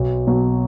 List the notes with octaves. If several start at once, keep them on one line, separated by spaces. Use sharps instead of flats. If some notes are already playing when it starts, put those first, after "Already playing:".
Already playing: B1
B2 F#3